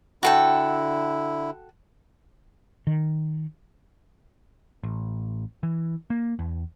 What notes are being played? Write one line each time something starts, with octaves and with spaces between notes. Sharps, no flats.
D3 E4 F#4 A4 G5
D#3
A1
E3
A#3
E2